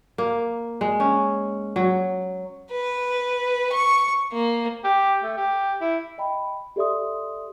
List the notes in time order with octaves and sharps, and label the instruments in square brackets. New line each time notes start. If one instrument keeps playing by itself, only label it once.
[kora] A#3
G#3
C#4
F#3
[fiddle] B4
C#6
A#3
[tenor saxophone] G4
A3
G4
E4
[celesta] D#5 G5 B5
G4 A4 D5 E5 C6 D#6